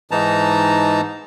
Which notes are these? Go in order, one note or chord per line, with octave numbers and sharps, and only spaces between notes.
G#2 E3 D#4 A5 A#5